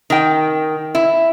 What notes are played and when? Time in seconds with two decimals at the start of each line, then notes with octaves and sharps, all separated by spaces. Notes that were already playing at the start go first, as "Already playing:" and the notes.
0.10 D#3 G5
0.95 E4